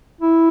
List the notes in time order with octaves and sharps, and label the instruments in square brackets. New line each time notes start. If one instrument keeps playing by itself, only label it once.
[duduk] E4